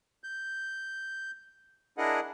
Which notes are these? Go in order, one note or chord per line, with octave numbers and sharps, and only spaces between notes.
G6
D4 E4 G#4 A#4 D#5 F#5